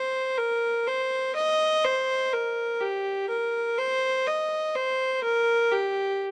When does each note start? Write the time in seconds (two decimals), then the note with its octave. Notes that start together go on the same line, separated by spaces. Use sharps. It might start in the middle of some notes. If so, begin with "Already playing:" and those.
Already playing: C5
0.38 A#4
0.87 C5
1.35 D#5
1.84 C5
2.33 A#4
2.81 G4
3.29 A#4
3.78 C5
4.27 D#5
4.75 C5
5.24 A#4
5.72 G4